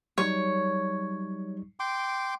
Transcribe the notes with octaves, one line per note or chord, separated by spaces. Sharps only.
F#3 G3 D#4 C#5
G5 C6 D6